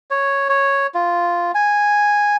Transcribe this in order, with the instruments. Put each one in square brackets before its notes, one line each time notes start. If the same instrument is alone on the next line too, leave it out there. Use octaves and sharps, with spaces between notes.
[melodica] C#5
C#5
F4
G#5